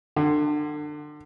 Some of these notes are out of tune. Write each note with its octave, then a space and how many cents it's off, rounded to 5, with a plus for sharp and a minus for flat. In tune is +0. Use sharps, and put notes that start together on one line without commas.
D3 +25